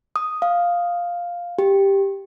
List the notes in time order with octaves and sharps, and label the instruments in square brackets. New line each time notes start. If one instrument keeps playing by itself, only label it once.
[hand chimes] D#6
F5
G4